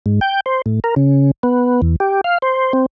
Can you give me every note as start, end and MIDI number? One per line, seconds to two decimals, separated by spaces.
0.06 0.20 44
0.21 0.40 79
0.46 0.62 72
0.66 0.80 45
0.84 0.95 70
0.96 1.31 49
1.43 1.81 59
1.82 1.96 40
2.00 2.21 67
2.24 2.38 77
2.42 2.73 72
2.73 2.86 60